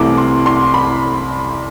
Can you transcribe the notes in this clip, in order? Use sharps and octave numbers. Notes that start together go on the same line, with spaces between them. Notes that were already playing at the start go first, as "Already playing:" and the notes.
Already playing: C2 C3 E3 A3 D6
C6
C6
B5